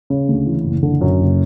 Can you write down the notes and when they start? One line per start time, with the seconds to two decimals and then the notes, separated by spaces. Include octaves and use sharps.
0.10 C#3
0.29 D2
0.46 E3
0.64 F#1
0.83 D3
1.01 F#2
1.20 F#1